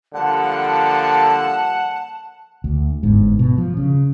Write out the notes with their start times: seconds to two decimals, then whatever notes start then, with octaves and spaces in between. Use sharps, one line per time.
0.14 D3 F3 G3 A#3 F#5 A5
2.64 D2
3.03 G1 G#2
3.39 B2
3.58 F3
3.77 C#3